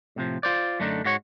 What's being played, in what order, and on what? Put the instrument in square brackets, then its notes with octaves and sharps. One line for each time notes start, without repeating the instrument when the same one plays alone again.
[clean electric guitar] A2 C3 F3
F4 C5 D5
F#2 D3 A3 D4 D#4
G#2 G#3 F#4 C#5